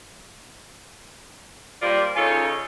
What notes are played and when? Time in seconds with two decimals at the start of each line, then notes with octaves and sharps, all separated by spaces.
1.82 G3 A#3 F4 A#4 C5 D5
2.16 C#3 D#4 F4 A4 C#5 G#5